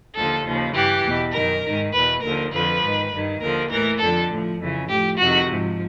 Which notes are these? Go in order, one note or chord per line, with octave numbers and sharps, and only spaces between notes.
D#2 D3 F3 A4
D#2 C#3 F3
G2 E3 G4
E2 B2
F#2 D#3 A#4
G#2 D#3
E2 B2 B4
D#2 D3 F3 A#4
F2 D3 F3 B4
G#2 D#3
G2 D#3
D#2 D3 F3 A#4
A2 E3 A#4
F2 D3 F3 A4
A2 F3
F2 C#3 E3
A2 F3 G4
F2 C3 D#3 F#4
G#2 F3